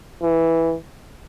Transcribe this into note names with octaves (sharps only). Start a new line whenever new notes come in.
E3